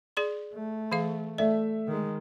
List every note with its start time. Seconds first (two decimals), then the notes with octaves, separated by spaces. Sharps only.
0.17 G#4 D5 C6
0.54 A3
0.92 E3 G#4 F5
1.38 A3 D5 E5
1.87 D#3 G#3